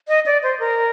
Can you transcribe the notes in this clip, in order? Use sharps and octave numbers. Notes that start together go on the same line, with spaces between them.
D#5
D5
C5
A#4